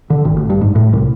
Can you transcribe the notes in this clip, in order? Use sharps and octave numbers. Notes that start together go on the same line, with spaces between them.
D3
G#1
A1
G2
G#2
A2
C2